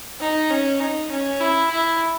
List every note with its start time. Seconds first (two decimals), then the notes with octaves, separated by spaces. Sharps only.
0.20 D#4
0.50 C#4
0.80 D#4
1.11 C#4
1.40 E4
1.71 E4